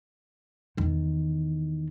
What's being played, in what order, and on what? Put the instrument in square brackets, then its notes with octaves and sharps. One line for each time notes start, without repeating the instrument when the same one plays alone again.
[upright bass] E2 D#3